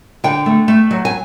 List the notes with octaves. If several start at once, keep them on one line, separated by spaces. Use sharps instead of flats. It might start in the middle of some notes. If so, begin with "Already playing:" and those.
D3 G5
A3
A3
F#3
G#5